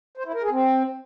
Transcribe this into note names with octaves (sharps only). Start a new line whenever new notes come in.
C5
E4
A#4
G#4
C4